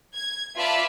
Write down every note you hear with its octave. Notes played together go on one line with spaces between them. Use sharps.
G#6
F4 B4 D5 E5 A5 B5